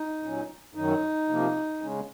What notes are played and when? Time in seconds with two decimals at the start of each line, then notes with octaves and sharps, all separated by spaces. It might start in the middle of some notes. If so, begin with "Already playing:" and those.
Already playing: D#4
0.22 A#2 F#3 C#4
0.75 F#2 D#3 F#3 D#4
1.29 C3 F3 A#3
1.82 C#3 G#3 C#4